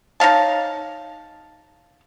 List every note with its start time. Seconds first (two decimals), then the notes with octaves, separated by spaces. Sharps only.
0.20 D#4 C#5 F5 A5